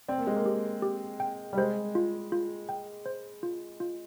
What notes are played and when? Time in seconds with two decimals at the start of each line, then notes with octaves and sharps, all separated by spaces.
0.08 C4 D5
0.18 A#3
0.27 G#3
0.36 A#3
0.46 G4
0.82 G4
1.20 G5
1.53 G3
1.57 G#3 C5
1.95 F4
2.32 F4
2.69 G5
3.06 C5
3.43 F4
3.80 F4